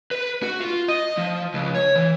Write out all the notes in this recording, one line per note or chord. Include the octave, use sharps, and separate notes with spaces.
B4
F#4
F4
D#5
F3
C#2
C#5
E3